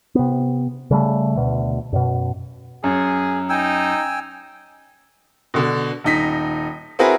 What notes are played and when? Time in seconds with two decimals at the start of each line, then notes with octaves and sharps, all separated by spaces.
0.15 C3 B3
0.91 C#3 G3 A3
1.36 D2 B2
1.93 F#2 B2
2.84 F#2 G#4
3.50 D#4 G5 G#5 E6
5.54 B2 D3 D4
6.04 D#1 D#4 B6
6.99 C4 E4 F#4 G#4 A#4 B4